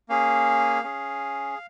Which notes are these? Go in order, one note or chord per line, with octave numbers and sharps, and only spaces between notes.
A#3 C#4 G#4 F5
C#4 G#4